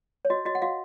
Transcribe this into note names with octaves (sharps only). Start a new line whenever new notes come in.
C#5
F#4 D#5
F#4 D#5
F#5
F#4 F5